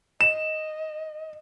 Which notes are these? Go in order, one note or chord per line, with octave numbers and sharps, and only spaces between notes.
D#5 E7